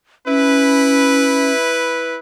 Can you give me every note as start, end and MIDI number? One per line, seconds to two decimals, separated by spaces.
0.26 1.52 61
0.26 2.18 64
0.26 2.18 71